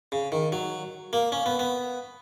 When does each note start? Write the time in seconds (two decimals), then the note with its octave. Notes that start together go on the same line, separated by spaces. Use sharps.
0.12 C#3
0.32 D#3
0.52 F#3
1.13 A#3
1.32 C#4
1.46 B3
1.59 B3